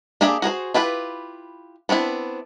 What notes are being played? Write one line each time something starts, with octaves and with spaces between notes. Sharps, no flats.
A#3 D4 G4 G#4 E5
F#4 G#4 A#4 C5
E4 F4 G4 B4
B3 C4 D4 E4